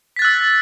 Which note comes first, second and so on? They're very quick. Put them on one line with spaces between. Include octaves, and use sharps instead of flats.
B6 A6 F#6 E6